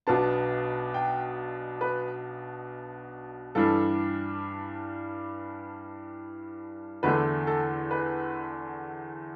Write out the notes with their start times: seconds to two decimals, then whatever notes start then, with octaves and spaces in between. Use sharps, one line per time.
0.07 B1 B2 B3 D4 A5
0.94 G5
1.81 B4
3.55 G2 E3 G3 D4 A4
7.03 E2 D3 A3 D4 B4
7.47 A4
7.91 B4